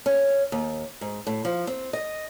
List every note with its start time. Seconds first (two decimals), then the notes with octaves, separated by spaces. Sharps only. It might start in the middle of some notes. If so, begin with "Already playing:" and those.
0.06 C#4
0.52 D#2
1.01 G#2
1.27 A2
1.45 F3
1.67 C4
1.93 D#5